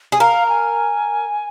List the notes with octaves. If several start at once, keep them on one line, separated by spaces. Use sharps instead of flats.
G#4
A#4 F5
A#5
G#5